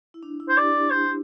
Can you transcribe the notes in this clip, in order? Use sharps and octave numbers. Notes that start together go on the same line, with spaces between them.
E4
D4
E4
C5
D4 G4 D5
D4
C5